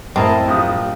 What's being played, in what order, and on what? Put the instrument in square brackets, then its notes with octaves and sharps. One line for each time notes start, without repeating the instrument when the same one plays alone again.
[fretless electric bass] F#2 A2 [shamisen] C4 A#4 [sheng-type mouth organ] E4 D#5 A5
[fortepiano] A#1 D#6 [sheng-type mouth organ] G4